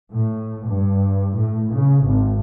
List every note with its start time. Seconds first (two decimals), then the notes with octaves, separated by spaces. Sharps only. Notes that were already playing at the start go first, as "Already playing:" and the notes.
0.13 A2
0.66 G2
1.35 A2
1.74 C#3
2.04 G#1